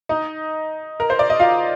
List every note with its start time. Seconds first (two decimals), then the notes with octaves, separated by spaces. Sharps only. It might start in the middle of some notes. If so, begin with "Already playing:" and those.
0.09 D#4 D#5
1.00 A#4
1.10 C5
1.19 D5
1.30 D#5
1.40 F4 F5